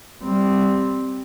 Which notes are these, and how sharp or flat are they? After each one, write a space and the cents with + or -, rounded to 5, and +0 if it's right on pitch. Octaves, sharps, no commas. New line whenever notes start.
G3 +0 C4 +0